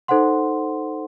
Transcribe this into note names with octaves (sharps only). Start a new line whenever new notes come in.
D#4 A4 C5 F#5 C6